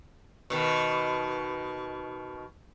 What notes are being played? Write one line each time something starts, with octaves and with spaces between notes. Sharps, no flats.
B2 D#3